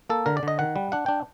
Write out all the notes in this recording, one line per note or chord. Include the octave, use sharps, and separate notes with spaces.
A#3 A4
D3 A#4
D5
D3 D#5
D#3 F#5
G3
D4 F#5
D4 G5